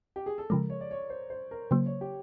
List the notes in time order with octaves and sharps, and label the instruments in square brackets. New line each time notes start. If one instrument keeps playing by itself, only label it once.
[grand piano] G4
G#4
A4
[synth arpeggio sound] C#3 F3 G#3 [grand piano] A#4
[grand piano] C#5
D5
C#5
C5
C5
A#4
[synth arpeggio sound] C#3 F#3 A#3 [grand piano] C5
[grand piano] C#5
G4